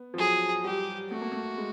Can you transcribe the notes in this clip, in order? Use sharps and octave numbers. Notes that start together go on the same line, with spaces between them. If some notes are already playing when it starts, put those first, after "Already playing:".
Already playing: B3
F3
F#3 G#4
G3 G4
A3 F#4
A#3
A3
G#3